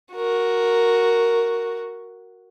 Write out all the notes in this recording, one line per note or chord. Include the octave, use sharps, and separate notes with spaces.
F#4 A#4